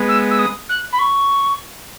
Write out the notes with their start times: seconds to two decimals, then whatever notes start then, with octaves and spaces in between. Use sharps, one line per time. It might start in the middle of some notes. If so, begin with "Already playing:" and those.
Already playing: G#3 B3
0.08 E6
0.30 E6
0.38 D#6
0.69 F#6
0.92 B5
0.98 C#6